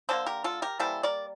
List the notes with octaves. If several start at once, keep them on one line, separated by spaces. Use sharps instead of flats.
D3 G3 A#3 A4 C5
G4 A#4
F4 A4
G4 A#4
E3 G3 A#3 A4 C5
A#4 D5